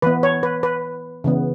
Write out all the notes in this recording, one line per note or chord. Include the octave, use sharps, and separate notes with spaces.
E3 B3 B4
C#5
B4
B4
C#3 E3 B3